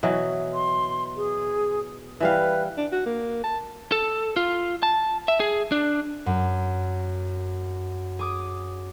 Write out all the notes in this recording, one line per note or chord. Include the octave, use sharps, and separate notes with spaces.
B2 E3 F#3
C6
G#4
E3 G3 B4 F5
D4
F#4
A#3
A5
A4
F4
A5
E5
G#4
D4
F#2
G#4 D6 D#6